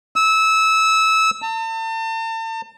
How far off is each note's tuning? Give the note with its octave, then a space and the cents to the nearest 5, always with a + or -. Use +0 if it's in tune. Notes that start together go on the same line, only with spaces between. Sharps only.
E6 -20
A5 +40